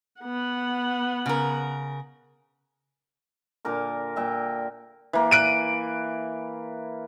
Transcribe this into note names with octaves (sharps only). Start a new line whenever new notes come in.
B3 F#5
C#3 A#4
A#2 D3 A#4 D6
A#2 E5 G5
E3 A#3
F#6 D7 D#7